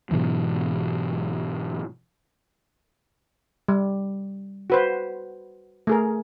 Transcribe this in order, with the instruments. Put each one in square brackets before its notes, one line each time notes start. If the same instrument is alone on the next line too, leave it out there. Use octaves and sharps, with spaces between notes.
[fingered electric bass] G#2 B2 E3 F#3
[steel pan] G3
F#4 B4 C5
A3 G#4 A#4